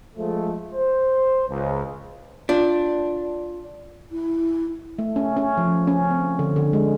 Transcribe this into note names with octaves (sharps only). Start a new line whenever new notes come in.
F3 G#3 A3
C5
C#2
D4 F4
E4
A3
C#4
C#4
F3
C#4
C4
D3
D3
G#3